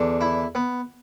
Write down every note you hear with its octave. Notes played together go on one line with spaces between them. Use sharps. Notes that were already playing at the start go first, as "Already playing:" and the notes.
Already playing: E2 D3
E4
B3